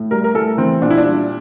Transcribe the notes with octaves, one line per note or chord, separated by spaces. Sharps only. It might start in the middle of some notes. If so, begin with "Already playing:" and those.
Already playing: A2
G3 A#4
A#4
A2 A4
E3 C4
A#2 D4
E4
D4
G3